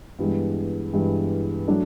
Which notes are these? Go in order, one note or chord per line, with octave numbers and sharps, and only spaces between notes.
G2 E3 G#3 B3
G2 E3 G#3 B3
F#3 A3 D4